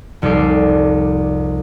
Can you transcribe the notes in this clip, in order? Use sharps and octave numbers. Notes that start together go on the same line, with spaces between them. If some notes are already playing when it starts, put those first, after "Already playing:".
F1 C2 D#4 A4 D6 C7